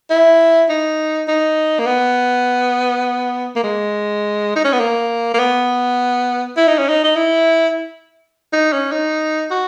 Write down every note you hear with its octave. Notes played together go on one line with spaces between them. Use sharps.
E4
D#4
D#4
A#3
B3
A#3
G#3
D#4
C#4
B3
A#3
A#3
B3
E4
D#4
C#4
D#4
D#4
E4
D#4
C#4
D#4
F#4